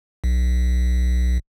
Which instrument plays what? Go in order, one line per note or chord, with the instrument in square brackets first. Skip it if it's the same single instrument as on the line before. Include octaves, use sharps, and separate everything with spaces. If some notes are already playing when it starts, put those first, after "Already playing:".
[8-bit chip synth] B1